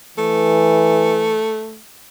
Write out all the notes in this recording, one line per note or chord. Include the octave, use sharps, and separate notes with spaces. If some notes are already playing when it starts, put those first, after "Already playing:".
E3 A3